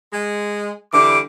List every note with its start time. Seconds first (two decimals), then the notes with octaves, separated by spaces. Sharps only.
0.13 G#3
0.93 D3 E3 G3 D6